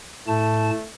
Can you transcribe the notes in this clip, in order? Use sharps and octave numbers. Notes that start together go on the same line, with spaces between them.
A2 A3 A5